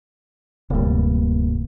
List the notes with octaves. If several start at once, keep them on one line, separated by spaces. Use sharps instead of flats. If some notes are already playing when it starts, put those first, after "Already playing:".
D1 G2 C3 A3 A#3